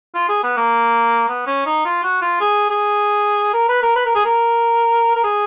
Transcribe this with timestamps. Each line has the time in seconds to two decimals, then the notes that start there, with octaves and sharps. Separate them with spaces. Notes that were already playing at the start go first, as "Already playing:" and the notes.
0.15 F4
0.29 G#4
0.43 B3
0.57 A#3
1.29 B3
1.46 C#4
1.66 D#4
1.85 F4
2.03 F#4
2.22 F4
2.41 G#4
2.70 G#4
3.53 A#4
3.69 B4
3.83 A#4
3.96 B4
4.06 A#4
4.15 G#4
4.25 A#4
5.15 A#4
5.24 G#4